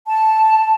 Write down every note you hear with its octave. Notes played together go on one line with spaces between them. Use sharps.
A5